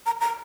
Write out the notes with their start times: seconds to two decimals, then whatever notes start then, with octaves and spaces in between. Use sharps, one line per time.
0.06 A#5
0.21 A#5